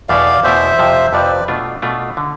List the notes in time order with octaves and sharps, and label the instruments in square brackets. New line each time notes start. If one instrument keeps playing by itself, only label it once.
[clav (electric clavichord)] E2 B2 A3 E4 [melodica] D5 F5
[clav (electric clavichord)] E2 B2 A3 E4 [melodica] C5 E5
[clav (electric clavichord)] F2 C3 F3
[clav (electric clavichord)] F2 C3 F3 [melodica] B4 D5
[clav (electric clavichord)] B2 A3 D4 F4
B2 A3 D4 F4
D3